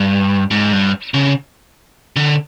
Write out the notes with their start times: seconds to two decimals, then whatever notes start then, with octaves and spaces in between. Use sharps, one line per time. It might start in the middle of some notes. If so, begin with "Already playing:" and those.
Already playing: G2
0.51 G#2
0.73 G2
1.14 C#3
2.16 D3